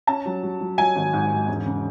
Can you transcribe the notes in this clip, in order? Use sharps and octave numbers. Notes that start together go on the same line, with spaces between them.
C#4 A5
F#3
F#3
F#3
F#3 G#5
G#1
G#2
G#2
E1
C#3